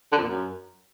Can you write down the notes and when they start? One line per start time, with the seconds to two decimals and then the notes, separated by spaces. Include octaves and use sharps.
0.12 D3
0.17 F2
0.23 A#2
0.28 F#2